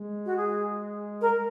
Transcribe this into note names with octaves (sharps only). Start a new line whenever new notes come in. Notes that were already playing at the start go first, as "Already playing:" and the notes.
Already playing: G#3
F#4
G#4
A#4